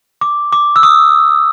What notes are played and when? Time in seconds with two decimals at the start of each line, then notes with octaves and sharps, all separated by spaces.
0.21 D6
0.52 D6
0.76 E6
0.83 D#6